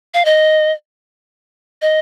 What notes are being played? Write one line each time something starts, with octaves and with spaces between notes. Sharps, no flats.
F5
D#5
D#5